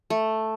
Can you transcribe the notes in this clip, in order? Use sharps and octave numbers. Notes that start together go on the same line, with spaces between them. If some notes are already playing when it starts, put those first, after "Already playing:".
A3